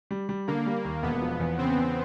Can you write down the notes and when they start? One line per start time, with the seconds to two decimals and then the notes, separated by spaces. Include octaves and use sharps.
0.11 G3
0.29 G3
0.47 D3 A#3
0.66 G3
0.85 D#2
1.02 E1 B3
1.22 F3
1.40 E2
1.58 C#3 C4
1.77 E2